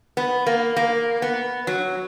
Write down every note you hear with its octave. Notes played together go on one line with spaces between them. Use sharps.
B3
A#3
A#3
B3
F#3